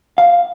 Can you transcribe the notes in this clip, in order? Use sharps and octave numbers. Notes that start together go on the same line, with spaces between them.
F5